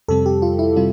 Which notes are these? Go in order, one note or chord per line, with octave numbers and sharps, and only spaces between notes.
F2 C3 G3 C4 A4
G4
F4
E4
C3 G3 C4 F4